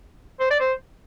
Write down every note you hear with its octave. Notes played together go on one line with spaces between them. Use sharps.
C5
D5
C5